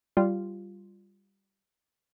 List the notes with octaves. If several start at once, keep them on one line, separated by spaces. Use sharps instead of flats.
G3 F4